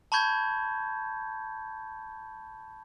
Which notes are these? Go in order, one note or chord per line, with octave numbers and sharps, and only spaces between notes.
A5 B5 C#6 G6 G#6